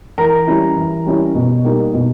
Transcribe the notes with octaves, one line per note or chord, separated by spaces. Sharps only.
E3 A#4 A#5
G3 C#4 E4
E3
G3 C#4 E4
B2
G3 A#3 D#4
B2